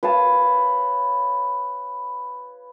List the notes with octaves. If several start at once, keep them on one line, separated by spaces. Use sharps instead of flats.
B4 C#5 F5 A5